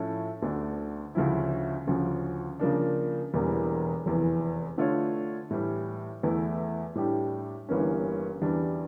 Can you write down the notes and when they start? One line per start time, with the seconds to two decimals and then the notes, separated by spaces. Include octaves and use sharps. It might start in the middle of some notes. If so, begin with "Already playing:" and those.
Already playing: A2 F3 C#4 E4 A4
0.42 D2 D3 A3 D4
1.15 D2 C#3 F3 C#4 E4
1.87 D2 C#3 F3 C#4
2.60 C#3 F3 A#3 D4
3.33 E1 E2 E3 G3 A#3
4.06 F1 E2 E3
4.77 D3 A3 D4 F4 C#5
5.51 A2 E3 G3
6.23 E2 E3 A3 E4
6.95 A2 G3 D4 G4
7.69 G1 G2 E3 A#3 C#4
8.41 E2 E3 G3 D4